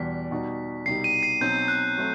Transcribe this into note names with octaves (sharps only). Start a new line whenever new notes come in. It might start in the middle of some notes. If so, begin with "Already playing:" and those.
Already playing: E2 B2 G3 B6
B2 G3 D#4 F#4
C2 B2 G3 D#4 G4 C7
D#7
C7
B2 F#3 C4 D#4 G6
F#6
F#3 A3 C4